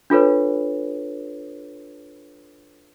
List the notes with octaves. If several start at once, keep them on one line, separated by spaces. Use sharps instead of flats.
D4 F4 A4 B4 C#5